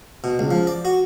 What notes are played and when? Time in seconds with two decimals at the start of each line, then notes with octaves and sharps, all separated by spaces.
0.24 B2
0.39 C#2
0.51 F3
0.67 D5
0.85 F#4